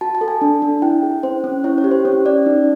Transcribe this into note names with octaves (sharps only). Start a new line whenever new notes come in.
F#4 A5
A5
A4
G#5
D4
D4
E4 G5
G#4
C#4 C5
C#4
E4 C#5
C#5
G4
C5
C#4 C#5
C#4 D5
D#4